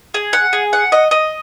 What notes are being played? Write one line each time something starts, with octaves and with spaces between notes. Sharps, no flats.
G#4
F#5
G#4
F#5
D#5
D#5